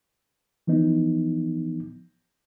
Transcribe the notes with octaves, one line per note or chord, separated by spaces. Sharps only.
E3 F3 B3 D#4